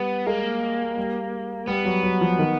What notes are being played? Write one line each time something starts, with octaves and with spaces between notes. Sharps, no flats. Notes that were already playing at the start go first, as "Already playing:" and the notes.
Already playing: G3 B3
G#3 A#3
G3
G3 B3
F#3
F#3
F3
D#3